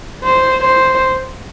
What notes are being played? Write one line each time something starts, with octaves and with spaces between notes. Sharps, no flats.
C5
C5